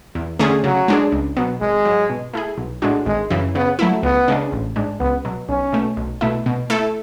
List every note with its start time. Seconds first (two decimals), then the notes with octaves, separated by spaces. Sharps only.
0.15 E2
0.39 D3 A3 C#4 G#4
0.64 C#3 F#3
0.88 G#3 D4 G#4
1.12 C#2
1.37 B2 F#3 B3
1.61 G#1 G#3
1.85 G#2 F#3
2.09 B2
2.33 A3 E4 G#4
2.58 B1
2.82 A2 G#3 D4 F#4
3.06 G#1 G#3
3.30 F#2 C#3 E3
3.55 C#3 B3
3.79 F#3 A3 E4
4.03 C#2 B3
4.28 C#3 G#3 D4
4.52 A1
4.76 G#2 G#3 D4
5.00 C#2 B3
5.25 B2 F#3
5.49 B1 C#4
5.72 B2 A3
5.97 B1
6.21 B2 A3 E4
6.46 B2
6.70 A3 E4 A4